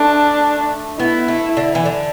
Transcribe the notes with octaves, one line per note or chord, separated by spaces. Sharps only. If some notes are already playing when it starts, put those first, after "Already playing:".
Already playing: A3 D4
B3 E4
A3
D3
E3
D3